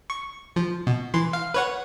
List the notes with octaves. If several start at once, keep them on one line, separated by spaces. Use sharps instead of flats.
C#6
F3
B2
E3 C6
F5
B4 C#5 F#5